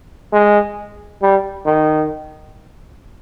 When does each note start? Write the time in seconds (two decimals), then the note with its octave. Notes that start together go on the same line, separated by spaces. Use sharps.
0.33 G#3
1.22 G3
1.66 D#3